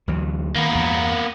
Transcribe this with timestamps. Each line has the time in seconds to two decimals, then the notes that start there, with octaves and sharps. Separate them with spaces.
0.08 D2 E3 F#3
0.55 D#3 A#3 B3
0.71 E2 G2